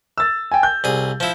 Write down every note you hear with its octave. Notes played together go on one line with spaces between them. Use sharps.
E6 A6
G5 G#5
G6
C2 G#4
F3 E4